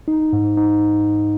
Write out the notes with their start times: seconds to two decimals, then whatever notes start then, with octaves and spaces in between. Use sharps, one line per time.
0.08 D#4
0.33 G#2
0.57 D#4